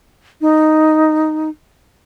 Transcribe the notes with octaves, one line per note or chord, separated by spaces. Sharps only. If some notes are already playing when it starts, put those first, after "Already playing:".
D#4